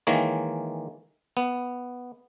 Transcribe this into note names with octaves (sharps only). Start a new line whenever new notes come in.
D#3 E3 G#3 A#3 C#5
B3